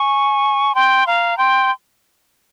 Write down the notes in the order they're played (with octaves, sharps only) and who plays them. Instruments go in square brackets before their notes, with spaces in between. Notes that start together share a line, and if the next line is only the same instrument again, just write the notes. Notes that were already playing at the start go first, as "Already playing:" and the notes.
Already playing: [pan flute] G#5 [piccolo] C#6
[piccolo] G5 [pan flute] C6
[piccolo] F5 [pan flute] A#5
[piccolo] G5 [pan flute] C6